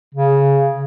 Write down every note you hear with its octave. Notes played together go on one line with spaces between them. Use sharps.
C#3